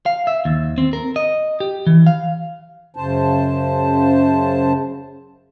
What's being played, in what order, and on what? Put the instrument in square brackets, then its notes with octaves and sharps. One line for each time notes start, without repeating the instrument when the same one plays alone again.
[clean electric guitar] F5
E5
D#2
C4
A#4
D#5
G4
E3
F5
[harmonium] F#2 C#3 C5 A5